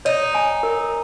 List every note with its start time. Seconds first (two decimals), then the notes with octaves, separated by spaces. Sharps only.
0.05 D#4 C#5
0.35 G#5
0.63 A#4